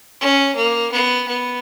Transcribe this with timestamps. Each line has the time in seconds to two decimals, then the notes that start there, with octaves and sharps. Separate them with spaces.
0.20 C#4
0.55 A#3
0.91 B3
1.28 B3